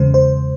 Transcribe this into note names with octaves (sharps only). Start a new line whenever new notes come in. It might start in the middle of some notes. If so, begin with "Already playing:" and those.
Already playing: E2 C#3 G#3 C5
C5